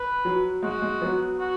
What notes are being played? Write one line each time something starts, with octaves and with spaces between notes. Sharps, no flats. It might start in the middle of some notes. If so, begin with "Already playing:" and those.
Already playing: B4
F#3
G#3 F#4
G#3
F#3 B3
F#4